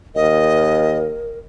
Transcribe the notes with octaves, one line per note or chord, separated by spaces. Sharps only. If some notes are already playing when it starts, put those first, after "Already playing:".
D#2 A#4 D#5